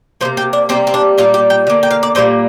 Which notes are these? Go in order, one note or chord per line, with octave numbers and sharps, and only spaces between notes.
C3 F3 A#3 C5
G4
D4
C3 G3 A#3 C4
C4
D4
A#2 G3 A#3 F4
G4
G5
D3 A#3
G5
F5
D5
A#2 G3 A#3 C5